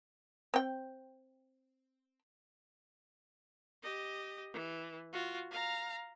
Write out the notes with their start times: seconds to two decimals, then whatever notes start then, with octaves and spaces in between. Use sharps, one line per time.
0.54 C4 G5
3.83 G4 D#5
4.53 E3
5.12 F4 F#4
5.51 F5 A#5